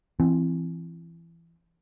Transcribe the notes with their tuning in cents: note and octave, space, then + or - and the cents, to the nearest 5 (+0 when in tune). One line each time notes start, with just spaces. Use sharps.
E3 +25 C4 +0